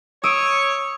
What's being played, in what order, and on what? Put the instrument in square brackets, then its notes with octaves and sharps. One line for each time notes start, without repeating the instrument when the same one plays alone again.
[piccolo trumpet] C#5 [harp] D#6 E6 D7